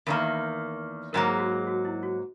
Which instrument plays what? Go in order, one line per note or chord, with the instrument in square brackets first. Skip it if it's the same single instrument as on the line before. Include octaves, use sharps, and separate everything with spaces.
[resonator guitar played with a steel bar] E2 D#3 A#3 [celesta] A#4
[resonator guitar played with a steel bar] G#2 F#3 A#3 [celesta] A#4
[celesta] G#4
F#4
G#4
F#4
E4
F#4